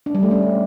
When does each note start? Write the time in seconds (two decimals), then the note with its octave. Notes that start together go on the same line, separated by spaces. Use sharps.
0.06 D4
0.15 G3
0.23 A3
0.31 C#4